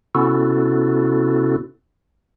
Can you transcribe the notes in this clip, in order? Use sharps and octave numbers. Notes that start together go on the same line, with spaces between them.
C3 B3 C#4 E4 F#4 A4